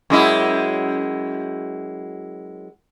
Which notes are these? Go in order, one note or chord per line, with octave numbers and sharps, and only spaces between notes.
F#2 G#3 E4